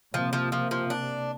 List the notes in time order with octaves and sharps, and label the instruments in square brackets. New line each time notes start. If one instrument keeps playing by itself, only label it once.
[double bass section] C3 A#3 [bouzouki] F3
[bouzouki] F3
F3
F3
D4